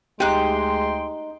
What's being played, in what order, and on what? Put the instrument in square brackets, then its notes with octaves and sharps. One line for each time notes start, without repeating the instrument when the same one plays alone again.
[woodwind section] D2 G5 C6 [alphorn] G#3 [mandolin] D#4 F#6 [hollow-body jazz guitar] G4